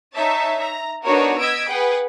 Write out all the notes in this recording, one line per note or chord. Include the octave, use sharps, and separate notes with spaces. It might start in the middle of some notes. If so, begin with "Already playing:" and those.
D#4 C#5 E5 A5
A#5
B3 D4 D#4 F#4 A#4 C#5
D#5 E6 G#6 B6 D7
G#4 B4 F#5 G5